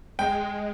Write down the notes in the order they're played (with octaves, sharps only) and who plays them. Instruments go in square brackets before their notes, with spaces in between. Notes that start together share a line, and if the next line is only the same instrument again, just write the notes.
[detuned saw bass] G#3 [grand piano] G5